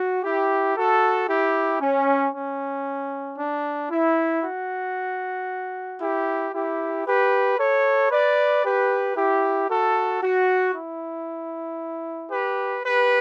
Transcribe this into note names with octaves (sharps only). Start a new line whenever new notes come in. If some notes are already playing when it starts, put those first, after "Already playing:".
Already playing: F#4
E4 G4
F#4 A4
E4 G4
C#4
C#4
D4
E4
F#4
E4 G4
E4 G4
G4 B4
A4 C#5
B4 D5
G4 B4
E4 G4
F#4 A4
F#4
E4
G4 B4
G4 B4